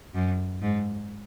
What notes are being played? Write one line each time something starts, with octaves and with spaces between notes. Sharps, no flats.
F#2
G#2